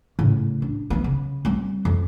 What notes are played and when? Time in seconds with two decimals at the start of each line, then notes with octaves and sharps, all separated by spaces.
0.19 A2 C#3
0.62 D4
0.90 F3 B3
1.04 C#3
1.45 G3 C4
1.85 F2